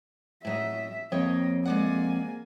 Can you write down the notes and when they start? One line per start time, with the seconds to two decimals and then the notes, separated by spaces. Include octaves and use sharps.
0.45 A2 F#3 D#5 E5
1.12 F2 A#3 C#5 D#5 G5
1.65 G#3 A#3 D5 F#5 G#5